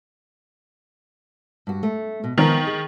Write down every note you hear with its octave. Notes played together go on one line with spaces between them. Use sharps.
G2 F#4
A3
B2
D#3 F3 B3 A#4 G#5
G#4